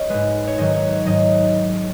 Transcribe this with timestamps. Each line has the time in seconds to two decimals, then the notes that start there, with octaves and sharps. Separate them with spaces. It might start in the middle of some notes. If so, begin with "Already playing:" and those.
Already playing: C#5 D#5
0.09 G#2 G#3 B4
0.47 C#5
0.58 G#2 D#3 F#3 D#5
0.74 C#5
0.90 C#5
1.06 G#2 D#3 F#3 D#5